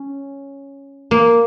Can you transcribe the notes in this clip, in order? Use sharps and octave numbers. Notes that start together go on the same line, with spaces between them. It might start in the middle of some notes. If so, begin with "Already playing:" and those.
Already playing: C#4
A#3